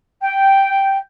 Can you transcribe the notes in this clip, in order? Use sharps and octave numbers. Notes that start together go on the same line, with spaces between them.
G5